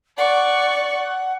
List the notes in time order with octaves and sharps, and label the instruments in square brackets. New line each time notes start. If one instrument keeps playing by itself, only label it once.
[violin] D5 C#6 [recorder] F#5